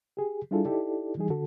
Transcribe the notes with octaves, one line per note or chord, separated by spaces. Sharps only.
G4 G#4
G3 D4 E4 F4 G#4 A4
D#4 E4 G4 A4 D5
E3 G3 D#4 G#4
D3 F#4 A4